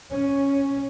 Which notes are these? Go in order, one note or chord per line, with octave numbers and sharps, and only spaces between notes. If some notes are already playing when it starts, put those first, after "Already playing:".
C#4